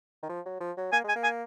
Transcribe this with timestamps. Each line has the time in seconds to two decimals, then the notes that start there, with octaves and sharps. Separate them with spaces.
0.23 D#3
0.29 F3
0.46 F#3
0.61 F3
0.77 F#3
0.93 A#3 G#5
1.04 G#3 G#5
1.16 A#3
1.24 G#5